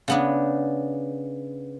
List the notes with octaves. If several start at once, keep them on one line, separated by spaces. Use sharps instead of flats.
C#3 B3 D4